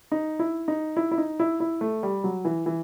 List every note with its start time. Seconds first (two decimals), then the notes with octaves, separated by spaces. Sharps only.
0.12 D#4
0.39 E4
0.68 D#4
0.97 E4
1.11 E4
1.18 D#4
1.40 E4
1.60 E4
1.81 A3
2.03 G3
2.24 F#3
2.45 E3
2.66 E3